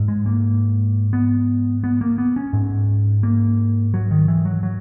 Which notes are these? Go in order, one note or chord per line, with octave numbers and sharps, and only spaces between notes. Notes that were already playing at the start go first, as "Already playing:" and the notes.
Already playing: G#2
G#3
A#3
B3
B3
A#3
B3
C#4
G#2
A#3
F#3
D#3
E3
F#3
F#3